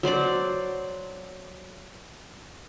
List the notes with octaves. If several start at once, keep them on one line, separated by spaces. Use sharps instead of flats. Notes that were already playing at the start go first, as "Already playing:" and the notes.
F#3 C5 D5 D6